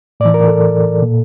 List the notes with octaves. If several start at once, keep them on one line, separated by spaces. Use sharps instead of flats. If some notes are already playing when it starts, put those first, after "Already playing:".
A2 E3 D5
A#4
A4
A#2